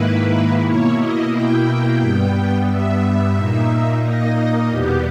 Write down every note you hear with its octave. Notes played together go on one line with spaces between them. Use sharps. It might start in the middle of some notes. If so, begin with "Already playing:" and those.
Already playing: G#2 D#3 A#3 E4 B4
B2 A#3 E4 C#5
D#5
G5
G2 G3 B3
E5
A#2 A#3 D#4
D#5
E2 B2 G3 B3 G4